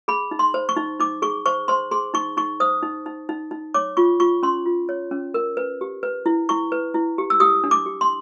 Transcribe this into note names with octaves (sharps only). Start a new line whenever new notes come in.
G#4 B5
D#4
C6
C5
C#6
D#4
D#4 D6
G#4 C#6
C5 C#6
C5 C6
G#4 C6
D#4 C#6
D#4 C#6
C5 D#6
D#4
D#4
D#4
D#4
C#5 D6
F4 C#6
F4 C#6
C#4 C6
F4
C#5
C#4
A#4
B4
G4
B4
E4
E4 C#6
B4
E4
G4
E6
G4 D#6
D4
D6
G4
C6